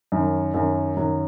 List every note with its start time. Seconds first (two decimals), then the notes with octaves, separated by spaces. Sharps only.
0.12 F#2 D#3 F#3
0.54 F#2 D#3 F#3
0.97 F#2 D#3 F#3